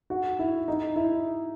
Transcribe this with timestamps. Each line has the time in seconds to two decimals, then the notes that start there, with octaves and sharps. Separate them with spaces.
0.10 F#4
0.39 E4
0.68 D#4
0.96 E4